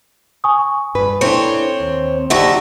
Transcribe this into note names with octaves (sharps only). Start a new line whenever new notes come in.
G#5 C#6 D#6
G2 B4
C4 D4 E4 A4 C5 C#5
D#2
D3 F#3 D#4 G4 E5 F#5 C#6 A#6